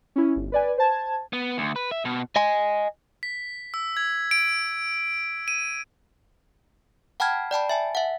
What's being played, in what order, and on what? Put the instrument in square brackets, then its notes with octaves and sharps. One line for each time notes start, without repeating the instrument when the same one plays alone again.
[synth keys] C#4 E4
G1
B4 D5 G#5
C5 A5 G#6
[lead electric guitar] B3
D2
B4
E5
B2
D#5 G#5
[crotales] B6
E6
G#6
D7
D#7
[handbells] F#5 G5 A5 B5 F6 G#6
D5 G5 A5 B5
E5 G#5 A5
E5 F#5